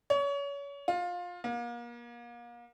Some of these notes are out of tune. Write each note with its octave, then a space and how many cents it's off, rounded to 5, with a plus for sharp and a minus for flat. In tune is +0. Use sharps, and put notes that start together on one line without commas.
C#5 +30
F4 +20
A#3 +35